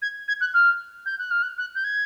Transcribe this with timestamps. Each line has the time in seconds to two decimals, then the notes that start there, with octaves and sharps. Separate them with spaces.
0.01 G#6
0.28 G#6
0.40 F#6
0.53 F6
1.05 G6
1.18 F#6
1.30 F6
1.42 F#6
1.58 F#6
1.75 G6
1.84 G#6